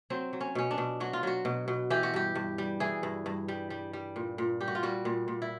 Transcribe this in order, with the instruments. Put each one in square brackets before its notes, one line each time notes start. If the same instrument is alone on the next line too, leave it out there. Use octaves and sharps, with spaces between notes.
[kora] F#3 C4
F#3
C#4
B2 C#4
D4
B2
F#3 F#4
F4
F#3 F#4
B2
B2
E3 G4
F#4
G2 G4
G2
G3
E3 G#4
G2
G2
G3
G3
G3
A#2
A#2
G3 G4
F#4
F4
G3 F#4
A#2
A#2
E4